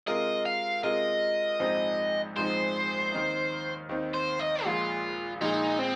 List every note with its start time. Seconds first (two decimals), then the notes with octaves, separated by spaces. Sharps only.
0.07 C3 G#3 F4 A#4 D#5
0.46 F5
0.83 C3 G#3 F4 A#4 D#5
1.59 A#1 G#2 F3 C4 D#4
2.36 A#1 G#2 F3 C4 D#4 C5
3.12 D#2 D#3 C4 D#4
3.89 D#2 D#3 C4 D#4
4.14 C5
4.39 D#5
4.64 A#1 A#2 G#3 F4
5.41 A#1 A#2 G#3 D#4
5.79 C4